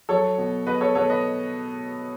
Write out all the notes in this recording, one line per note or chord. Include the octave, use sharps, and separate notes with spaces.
F#3 A4 C#5
B2
B2 B4 D#5
A4 C#5
B2 A4 C#5
B4 D#5